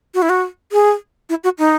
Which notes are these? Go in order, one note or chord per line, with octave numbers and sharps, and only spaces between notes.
F#4
E4
F#4
G#4
E4
F#4
D#4